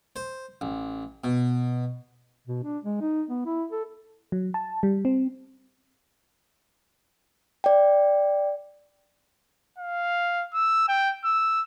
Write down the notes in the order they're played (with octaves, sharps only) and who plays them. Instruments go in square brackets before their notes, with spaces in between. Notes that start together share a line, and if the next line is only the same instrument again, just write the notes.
[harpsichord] C5
A1
B2
[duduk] B2
D4
G#3
D#4
B3
E4
A4
[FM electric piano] F#3
A5
G3
C4
[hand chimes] D5 G5
[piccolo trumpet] F5
E6
G5
E6